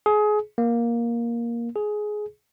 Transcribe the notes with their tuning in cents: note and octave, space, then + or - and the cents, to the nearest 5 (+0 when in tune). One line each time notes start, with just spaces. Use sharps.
G#4 +25
A#3 +10
G#4 +15